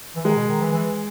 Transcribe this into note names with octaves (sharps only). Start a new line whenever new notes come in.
E3
D#3 G#3
B2
D#3
E3
E3